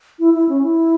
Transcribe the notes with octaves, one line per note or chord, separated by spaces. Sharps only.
E4
E4
C#4
E4